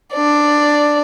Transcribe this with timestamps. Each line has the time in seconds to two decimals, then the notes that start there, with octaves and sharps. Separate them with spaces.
0.13 D4 D5